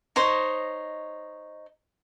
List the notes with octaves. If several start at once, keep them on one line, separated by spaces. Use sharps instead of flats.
D#4 C5 C#5 D#5